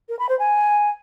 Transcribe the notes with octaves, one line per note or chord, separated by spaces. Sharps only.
A#4
B5
C5
G#5